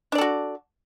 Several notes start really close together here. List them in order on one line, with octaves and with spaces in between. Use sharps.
D4 D5 A4 F#4